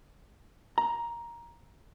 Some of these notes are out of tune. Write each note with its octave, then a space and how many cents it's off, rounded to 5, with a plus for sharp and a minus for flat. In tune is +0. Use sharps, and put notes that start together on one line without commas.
A#5 +10